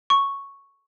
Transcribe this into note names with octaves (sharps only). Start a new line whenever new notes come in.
C#6